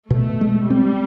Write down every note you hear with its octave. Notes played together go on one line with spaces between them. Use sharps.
B2 A3
G#3
G3 C4